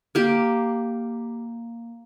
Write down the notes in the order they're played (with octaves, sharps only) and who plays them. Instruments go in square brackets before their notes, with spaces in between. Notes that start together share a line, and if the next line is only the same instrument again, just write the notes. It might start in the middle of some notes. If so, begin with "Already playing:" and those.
[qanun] A#3 G4